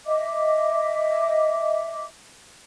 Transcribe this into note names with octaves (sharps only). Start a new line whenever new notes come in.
D#5 E5 D6